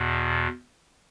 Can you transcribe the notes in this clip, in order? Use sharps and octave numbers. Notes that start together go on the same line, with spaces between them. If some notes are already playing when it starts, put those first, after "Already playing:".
Already playing: E2 B2